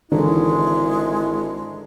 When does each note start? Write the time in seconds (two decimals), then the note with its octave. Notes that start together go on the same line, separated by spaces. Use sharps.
0.12 G#1 D3 E3 G#3 D#4 E4